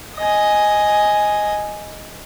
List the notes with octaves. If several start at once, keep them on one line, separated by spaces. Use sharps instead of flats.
D#5 G#5